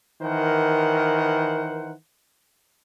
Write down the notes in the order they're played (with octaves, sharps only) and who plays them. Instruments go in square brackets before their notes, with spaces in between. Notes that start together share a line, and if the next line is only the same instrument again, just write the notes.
[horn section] D#3 E3 A#4 C5 F#5